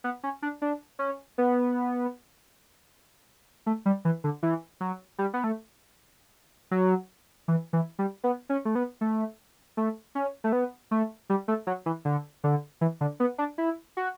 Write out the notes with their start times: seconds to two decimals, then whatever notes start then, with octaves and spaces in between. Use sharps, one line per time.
0.04 B3
0.23 C#4
0.42 D4
0.62 D4
0.99 C#4
1.38 B3
3.66 A3
3.86 G3
4.05 E3
4.24 D3
4.43 E3
4.80 F#3
5.18 G3
5.34 B3
5.44 A3
6.71 F#3
7.48 E3
7.73 E3
7.99 G3
8.24 B3
8.49 C#4
8.65 A3
8.75 B3
9.01 A3
9.77 A3
10.15 C#4
10.44 A3
10.52 B3
10.91 A3
11.30 G3
11.48 A3
11.67 F#3
11.86 E3
12.05 D3
12.44 D3
12.81 E3
13.01 D3
13.20 B3
13.38 D4
13.58 E4
13.97 F#4